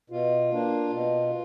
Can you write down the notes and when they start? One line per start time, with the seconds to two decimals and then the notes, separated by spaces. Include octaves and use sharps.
0.10 B2 F4
0.51 A#3 D4
0.90 B2